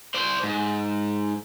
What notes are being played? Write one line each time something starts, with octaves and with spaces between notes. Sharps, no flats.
C5 D5
G#2